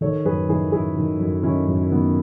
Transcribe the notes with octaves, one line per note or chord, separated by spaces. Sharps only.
D#3 A4 C#5
F#2 G#4 B4
D#3 E4 G#4
F#2 E4 G#4
D#3
F#2
D#3 C#4 E4
F#2
D#3 B3